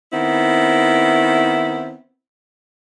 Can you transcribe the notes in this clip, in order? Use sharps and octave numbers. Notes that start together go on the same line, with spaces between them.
D#3 B3 C4 E4